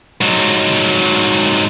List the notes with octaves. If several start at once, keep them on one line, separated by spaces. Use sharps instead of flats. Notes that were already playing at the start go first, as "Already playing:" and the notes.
G#2 F#3